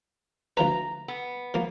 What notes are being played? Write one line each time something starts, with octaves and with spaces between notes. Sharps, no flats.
D2 F3 B4 A#5
B3
F3 A#3